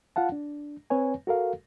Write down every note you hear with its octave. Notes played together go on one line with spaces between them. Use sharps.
F4 F5 F#5 A5
D4
C4 B4 C#5 G#5
F#4 A4 A#4 F5